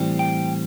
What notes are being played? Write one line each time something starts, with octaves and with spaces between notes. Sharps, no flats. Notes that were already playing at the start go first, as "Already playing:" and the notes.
Already playing: A2 E3 G3 C4
G5